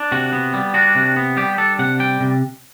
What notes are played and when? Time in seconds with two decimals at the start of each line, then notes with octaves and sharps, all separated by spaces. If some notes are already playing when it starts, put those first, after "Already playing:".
Already playing: D4
0.12 C3 F#4
0.33 B3
0.54 G3
0.74 D4 F#4
0.95 C3
1.16 B3
1.37 G3 G4
1.58 D4 A4
1.79 C3 F#5
2.00 G3 G5
2.20 C3